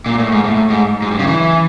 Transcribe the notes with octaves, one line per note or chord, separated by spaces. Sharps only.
A#2
A2
G#2
A2
G#2
G#2
G2
C#3
E3